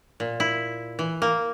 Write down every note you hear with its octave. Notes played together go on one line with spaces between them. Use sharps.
A#2
E4
E3
A#3